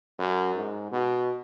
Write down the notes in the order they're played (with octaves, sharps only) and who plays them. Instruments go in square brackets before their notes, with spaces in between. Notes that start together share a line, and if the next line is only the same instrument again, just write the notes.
[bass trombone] F#2
G#2
B2